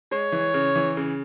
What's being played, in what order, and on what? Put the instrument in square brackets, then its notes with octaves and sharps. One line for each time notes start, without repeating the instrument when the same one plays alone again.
[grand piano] G#3 [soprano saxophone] C#5
[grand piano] E3
C#3
E3
C#3